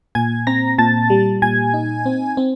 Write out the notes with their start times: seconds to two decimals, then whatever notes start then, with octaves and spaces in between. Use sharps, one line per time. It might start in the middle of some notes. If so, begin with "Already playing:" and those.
0.15 A#2 G#5 G#6
0.47 C4 A#5 A#6
0.78 A#2 A5 A6
1.10 G3
1.42 A#2 G#5 G#6
1.74 D#4
2.06 C4
2.37 C4